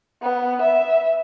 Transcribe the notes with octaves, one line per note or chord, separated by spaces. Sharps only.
B3
E5